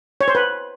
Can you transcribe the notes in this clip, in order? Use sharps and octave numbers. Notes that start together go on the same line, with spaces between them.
C#5
C5
B4